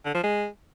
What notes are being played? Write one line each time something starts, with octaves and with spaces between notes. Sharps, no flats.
D3
F3
G#3